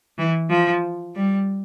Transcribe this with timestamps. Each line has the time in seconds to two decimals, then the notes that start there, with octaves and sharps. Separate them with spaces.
0.18 E3
0.50 F3
1.15 G3